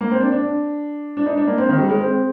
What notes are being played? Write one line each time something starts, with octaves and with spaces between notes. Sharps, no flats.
A#3
C4
D4
D4
D4
D#4
D4
A#3
C4
D#3
G3
G#3
C4